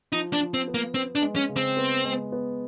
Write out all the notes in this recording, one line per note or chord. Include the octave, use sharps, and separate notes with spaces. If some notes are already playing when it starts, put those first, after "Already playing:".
F3 D#4
D4
F3
C4
B3
A#3
B3 C4
D4
G#3
C#4
C#3
C4
B3
G#3
B3